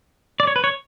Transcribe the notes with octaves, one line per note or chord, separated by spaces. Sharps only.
D5
C#5
B4
C#5